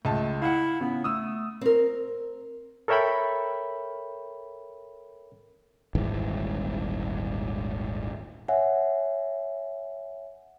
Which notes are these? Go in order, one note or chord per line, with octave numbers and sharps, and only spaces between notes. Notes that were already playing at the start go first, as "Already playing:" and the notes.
C#2 A3 A5
E4 F5 F#5
C#3 B3
A3 D#6 E6
C4 A#4
A4 A#4 C#5 E5 G5 B5
D#1 G#1 G#2 E3
C#5 E5 F#5 G#5